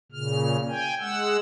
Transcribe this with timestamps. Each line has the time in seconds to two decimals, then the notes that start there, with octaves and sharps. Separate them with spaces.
0.12 A#2 C#3 F6
0.68 G5 G#5
1.00 G#3 F#5 E6